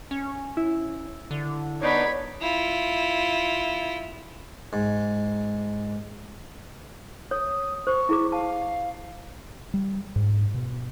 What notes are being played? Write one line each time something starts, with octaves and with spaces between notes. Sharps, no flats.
C#4
E4
D3
B3 D4 D#4 C#5 B5
E4 F4
G#2
C#5 D#6
C5 C#6
E4 G#4 D6
F5 A5
G3
G#2
B2